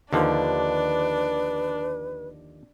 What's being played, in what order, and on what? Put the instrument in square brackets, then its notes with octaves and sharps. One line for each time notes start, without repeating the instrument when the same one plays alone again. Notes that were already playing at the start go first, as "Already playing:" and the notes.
[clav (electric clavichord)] D#2 D3 F3 [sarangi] D4 [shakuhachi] B4